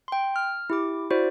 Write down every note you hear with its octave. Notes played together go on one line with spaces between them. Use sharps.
G5 C6
F6
E4 G4 D6
E4 F#4 C5 D5